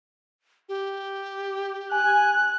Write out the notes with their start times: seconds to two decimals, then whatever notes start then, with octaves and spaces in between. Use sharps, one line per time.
0.69 G4
1.92 G#5 F#6